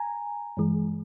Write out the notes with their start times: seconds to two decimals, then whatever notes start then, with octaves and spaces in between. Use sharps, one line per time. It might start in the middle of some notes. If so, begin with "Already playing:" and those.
Already playing: G#5 A#5
0.57 G2 E3 G#3